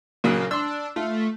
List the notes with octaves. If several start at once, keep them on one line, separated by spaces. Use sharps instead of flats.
A#1 C#3 F#3 A#3
D4 C6 E6
A3 F4